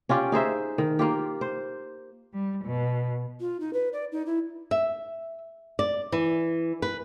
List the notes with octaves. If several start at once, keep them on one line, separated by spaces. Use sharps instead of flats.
C#4 F4 G4 D5
D#4 G#4 C5 E5
D#3
A#3 F4 G4
C5
G3
B2
F4
D#4
B4
D5
D#4
E4
E5
D5
E3
B4